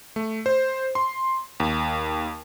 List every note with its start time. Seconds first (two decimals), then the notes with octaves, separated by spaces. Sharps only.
0.16 A3
0.46 C5
0.95 C6
1.60 D#2